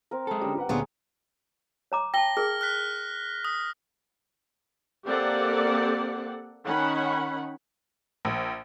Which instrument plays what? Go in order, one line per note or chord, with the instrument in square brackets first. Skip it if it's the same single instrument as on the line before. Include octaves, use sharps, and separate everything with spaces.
[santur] C4 A#4
[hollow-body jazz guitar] G#3 A4
[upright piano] D3 C#4 [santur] G3
[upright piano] G4 B4 F#5
[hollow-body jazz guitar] D2 A#2 [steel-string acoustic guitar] B3 D4 F4 [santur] G#4 C#5
[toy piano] C#5 A#5 D6
[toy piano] G5 A5 [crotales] A#6 G7
[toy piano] G#4 A#4 [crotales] F6
[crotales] F6 F#6 B6
D#6
[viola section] A#3 C4 G4 A4 D5 F#5
D#3 C#4 F#5 B5
[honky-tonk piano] A#1